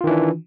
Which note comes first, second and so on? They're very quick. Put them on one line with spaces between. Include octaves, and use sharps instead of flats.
F4 D#3 E3 D4